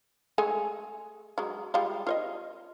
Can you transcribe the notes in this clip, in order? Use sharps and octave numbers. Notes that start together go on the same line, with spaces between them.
G#3 A3 G#5
F#3 G#3
G3 G#3 F4
F4 C#5 D#5